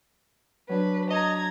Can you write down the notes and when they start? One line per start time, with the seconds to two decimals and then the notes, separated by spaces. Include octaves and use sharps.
0.69 F#3 D4 B4
1.10 D#5 A#5 G#6